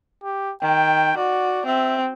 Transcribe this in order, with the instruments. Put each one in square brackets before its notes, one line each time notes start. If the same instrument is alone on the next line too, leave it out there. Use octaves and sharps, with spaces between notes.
[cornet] G4
[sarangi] D#3 [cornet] G5
[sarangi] F#4 [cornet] D5
[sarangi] C4 [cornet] E5